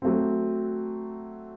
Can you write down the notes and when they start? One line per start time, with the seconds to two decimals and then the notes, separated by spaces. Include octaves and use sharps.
0.02 F#3 A3 C4